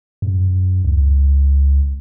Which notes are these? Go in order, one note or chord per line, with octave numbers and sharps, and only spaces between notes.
F#2
C#2